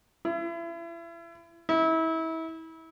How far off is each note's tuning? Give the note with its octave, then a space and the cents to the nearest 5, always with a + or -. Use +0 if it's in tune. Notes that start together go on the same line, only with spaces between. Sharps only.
E4 +35
E4 -30